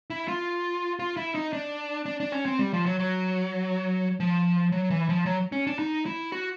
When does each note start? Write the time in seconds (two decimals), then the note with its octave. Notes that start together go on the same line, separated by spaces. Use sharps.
0.10 E4
0.28 F4
0.99 F4
1.17 E4
1.35 D#4
1.53 D4
2.06 D4
2.20 D4
2.32 C#4
2.46 C4
2.59 G3
2.73 F3
2.86 F#3
3.00 F#3
4.20 F3
4.72 F#3
4.90 E3
5.09 F3
5.26 F#3
5.52 C#4
5.67 D4
5.79 D#4
6.06 E4
6.32 F#4